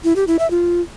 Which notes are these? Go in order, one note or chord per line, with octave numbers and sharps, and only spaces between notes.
E4
G4
E4
E5
F4